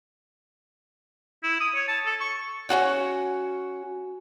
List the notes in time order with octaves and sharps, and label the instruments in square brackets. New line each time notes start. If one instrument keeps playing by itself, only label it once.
[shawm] E4
D#6
C#5
A5
A4
C#6
[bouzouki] C#4 F4 F#4 C#5